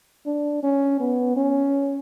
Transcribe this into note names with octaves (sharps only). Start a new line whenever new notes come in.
D4
C#4
B3
C#4